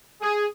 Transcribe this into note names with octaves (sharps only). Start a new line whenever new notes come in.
G#4